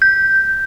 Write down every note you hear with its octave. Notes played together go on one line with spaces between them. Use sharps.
G6